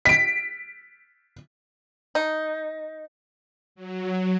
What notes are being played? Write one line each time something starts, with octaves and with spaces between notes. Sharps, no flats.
B6 D7
D#4
F#3